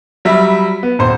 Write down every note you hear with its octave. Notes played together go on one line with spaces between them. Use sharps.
F#3 G3 E5 B5
B3
D#1 C5